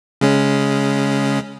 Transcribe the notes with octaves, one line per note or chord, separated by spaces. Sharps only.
C#3 G#3 C#4